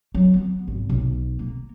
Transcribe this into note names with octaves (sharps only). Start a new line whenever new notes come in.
F#3
B3
G#1
B1
A#3